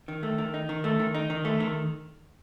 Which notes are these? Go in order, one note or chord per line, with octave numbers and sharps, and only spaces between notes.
D#3
A3
D#3
D#4
D#3
A3
D#3
D#4
D#3
A3
D#3